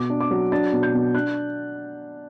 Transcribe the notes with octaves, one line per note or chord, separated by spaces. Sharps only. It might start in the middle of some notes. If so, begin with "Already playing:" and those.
Already playing: B2 D6
D4
D6
F#3
D4 A6
B2
G6
B2
D4 F#6